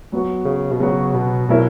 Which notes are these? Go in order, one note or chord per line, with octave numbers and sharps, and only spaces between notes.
F#3 B3 F#4
C#3
B2
C#3 F#3 B3 F#4
B2
B2 F#3 B3 E4 A#4